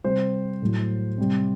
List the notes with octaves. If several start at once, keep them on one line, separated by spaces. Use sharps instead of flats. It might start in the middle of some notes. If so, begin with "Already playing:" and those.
C3 G3 C5
A2 F#3
C3 G3